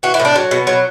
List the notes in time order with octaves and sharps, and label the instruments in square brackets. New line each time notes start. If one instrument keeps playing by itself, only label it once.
[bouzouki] E3 F#4
E4
A2
D4
F#3
B2
F#3